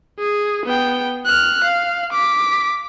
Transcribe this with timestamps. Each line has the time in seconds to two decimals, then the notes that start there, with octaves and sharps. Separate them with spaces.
0.19 G#4
0.65 B3 G5
1.26 F6 F#6
1.64 F5
2.13 D6 B6